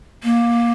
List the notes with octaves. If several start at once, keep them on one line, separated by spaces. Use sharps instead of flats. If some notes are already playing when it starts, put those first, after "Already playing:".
A#3